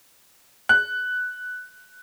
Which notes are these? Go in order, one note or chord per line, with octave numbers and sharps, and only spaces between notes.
F#6